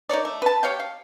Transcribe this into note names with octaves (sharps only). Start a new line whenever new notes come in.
D#4 A#4 C#5 D5
A3
B4 A5
G4 C#5 F5 G5
F5